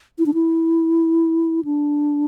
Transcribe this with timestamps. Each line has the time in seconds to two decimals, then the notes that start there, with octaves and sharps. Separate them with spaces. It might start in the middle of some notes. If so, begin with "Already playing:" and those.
0.18 E4
0.26 D4
0.34 E4
1.65 D4